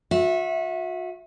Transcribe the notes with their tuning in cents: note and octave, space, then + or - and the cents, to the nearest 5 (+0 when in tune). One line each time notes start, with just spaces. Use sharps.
F#4 -35 E5 -5